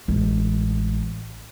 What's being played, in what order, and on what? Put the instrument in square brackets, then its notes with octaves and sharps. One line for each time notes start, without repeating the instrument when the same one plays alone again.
[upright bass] A1 G#3